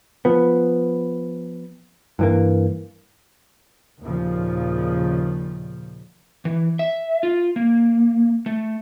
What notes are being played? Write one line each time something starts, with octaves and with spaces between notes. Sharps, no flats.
F3 B3
G2 E3 A#3
D#2 A#2 C#3 F3
E3
E5
F4
A#3
A3